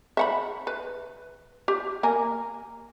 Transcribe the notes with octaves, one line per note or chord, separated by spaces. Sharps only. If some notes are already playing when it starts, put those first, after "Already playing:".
E5 F#5 B5
B4
G4
A#3 A#4 G#5